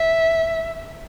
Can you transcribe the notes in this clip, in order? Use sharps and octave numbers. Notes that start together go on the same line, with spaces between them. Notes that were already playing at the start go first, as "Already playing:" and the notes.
Already playing: E5